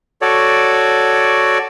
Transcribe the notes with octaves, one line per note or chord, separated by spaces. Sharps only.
F#4 A4 C#5 D5